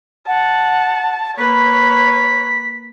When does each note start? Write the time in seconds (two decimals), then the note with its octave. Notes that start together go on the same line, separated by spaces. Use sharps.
0.27 F#5 A5
1.38 A#3 B4 C#5 B6